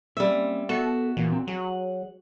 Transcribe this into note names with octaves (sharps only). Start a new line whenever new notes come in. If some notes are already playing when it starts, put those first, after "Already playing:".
G3 A#3 C4 C#4 E5
B3 F#4 A4 E5
A#2 E3 A#3
C4
F#3 G#4 F#5